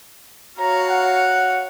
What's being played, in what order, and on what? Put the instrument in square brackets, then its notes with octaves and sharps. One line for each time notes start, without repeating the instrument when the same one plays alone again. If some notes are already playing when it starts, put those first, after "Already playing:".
[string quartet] F#4 C#5 F5 [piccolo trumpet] A#5
[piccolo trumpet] F#5